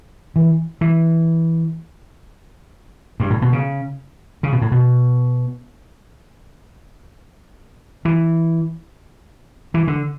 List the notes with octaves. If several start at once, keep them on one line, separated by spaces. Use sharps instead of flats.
E3
E3
G2
A2
B2
C#3
C#3
B2
A2
B2
E3
E3
D3